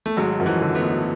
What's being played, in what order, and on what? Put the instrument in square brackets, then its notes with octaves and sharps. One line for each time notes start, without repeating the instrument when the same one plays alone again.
[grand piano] A3
[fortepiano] G#1 [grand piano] F#3 G#3
[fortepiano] F#2 [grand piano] F3
[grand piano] E3 F#3
[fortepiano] D3
[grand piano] A3 B3
[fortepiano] G#1